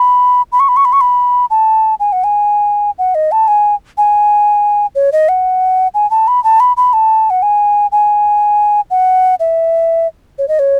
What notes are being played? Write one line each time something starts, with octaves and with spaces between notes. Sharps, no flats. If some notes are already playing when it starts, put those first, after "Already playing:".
Already playing: B5
B5
C#6
B5
C#6
B5
C#6
B5
A5
G#5
F#5
G#5
F#5
D#5
A5
G#5
G#5
C#5
D#5
F#5
G#5
A5
B5
A5
B5
B5
A5
F#5
G#5
G#5
F#5
E5
C#5
D#5
C#5